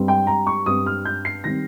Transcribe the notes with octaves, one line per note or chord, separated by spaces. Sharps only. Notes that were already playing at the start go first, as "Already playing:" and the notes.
Already playing: G2 G3 C4
G5
A#5
C#6
G2 G3 C4 D#6
F6
G6
C7
D#3 G3 C4 A#6